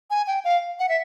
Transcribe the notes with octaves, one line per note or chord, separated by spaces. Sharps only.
G#5
G5
F5
F#5
E5